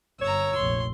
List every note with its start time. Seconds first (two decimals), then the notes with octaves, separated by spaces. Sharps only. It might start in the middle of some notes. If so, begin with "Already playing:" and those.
0.21 G1 C#5 A#5 E6
0.56 F1 A#1 C6